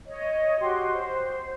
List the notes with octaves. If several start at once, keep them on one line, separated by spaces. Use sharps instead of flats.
C#5 D#5
F#4 G4 C6
C5